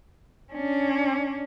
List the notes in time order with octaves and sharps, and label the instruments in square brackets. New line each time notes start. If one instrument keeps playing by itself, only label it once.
[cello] C#4 D4